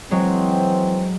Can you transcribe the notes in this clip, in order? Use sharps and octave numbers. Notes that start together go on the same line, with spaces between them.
E3 F#3 G#3 C4